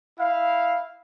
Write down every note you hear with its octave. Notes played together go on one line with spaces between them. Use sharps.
E4 F5